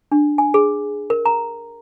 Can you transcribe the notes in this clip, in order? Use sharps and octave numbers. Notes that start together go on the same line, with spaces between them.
D4
G#5
G#4
A#4
A#5